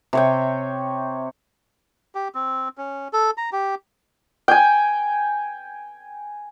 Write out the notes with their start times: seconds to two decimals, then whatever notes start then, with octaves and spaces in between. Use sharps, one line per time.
0.13 C3 C#5 G5
2.15 G4
2.35 C4
2.78 C#4
3.13 A4
3.37 A#5
3.52 G4
4.48 G5 G#5